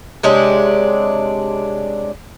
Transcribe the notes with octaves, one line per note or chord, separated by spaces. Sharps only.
C3 G#3 C#4 D4